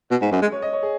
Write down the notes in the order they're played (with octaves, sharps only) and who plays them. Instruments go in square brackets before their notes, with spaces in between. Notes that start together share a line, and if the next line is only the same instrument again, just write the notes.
[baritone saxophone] B2
G#2
F#2
G#3
[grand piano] C#5
D#5
C#5
G#4